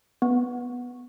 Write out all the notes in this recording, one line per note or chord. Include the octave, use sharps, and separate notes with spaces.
B3